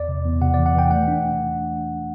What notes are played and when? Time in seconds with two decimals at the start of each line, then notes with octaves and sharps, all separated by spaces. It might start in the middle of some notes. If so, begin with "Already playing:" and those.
Already playing: E2 D5
0.08 C3
0.25 E2
0.41 C3 F#5
0.54 E3 D5
0.66 F#5
0.75 E3 G5
0.91 A3 F#5
1.08 D4